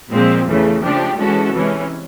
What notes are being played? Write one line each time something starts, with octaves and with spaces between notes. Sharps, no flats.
A#2 F3 G#3 C4
E2 C#3 E3 A3
C#3 F3 A3 D4 G4
E3 G#3 C#4 F#4 A4
C3 E3 G#3 C#4